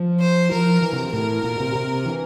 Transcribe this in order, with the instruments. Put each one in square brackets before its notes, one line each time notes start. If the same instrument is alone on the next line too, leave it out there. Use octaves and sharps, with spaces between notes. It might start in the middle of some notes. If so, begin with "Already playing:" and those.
Already playing: [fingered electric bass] F3
[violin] C5
[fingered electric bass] F3 [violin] A#4
[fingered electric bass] E3
C3
[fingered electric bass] A2 [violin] A#4
[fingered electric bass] A#2
C3
C3
E3